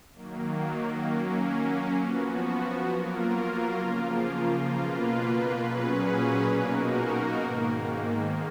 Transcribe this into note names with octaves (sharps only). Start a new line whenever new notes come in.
D#3 F#3 A#3
F#3 A#3 C#4
F3 B3 F#4
F#3 A#3 F4 A#4
C#3 F3 A#3 F4
B2 A#3 F4 B4
A#2 F#3 C#4 G#4 B4
B2 A#3 D#4 F#4 A#4
G#2 D#3 A#3